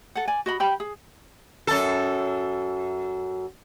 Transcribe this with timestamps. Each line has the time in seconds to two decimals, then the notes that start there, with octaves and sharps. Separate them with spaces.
0.15 A4 F#5
0.28 D5 G#5
0.46 F#4 D#5 B5
0.60 G4 G5 B5
0.80 G#4
1.67 F#2 A4